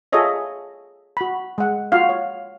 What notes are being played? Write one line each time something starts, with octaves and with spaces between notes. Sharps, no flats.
F4 G#4 A4 C#5 D#5 E5
F#4 B5
G#3 F#5
F4 F#4 F5
C#5